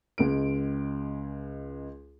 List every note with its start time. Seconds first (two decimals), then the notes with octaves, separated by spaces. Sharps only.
0.18 C#2 G#3 D7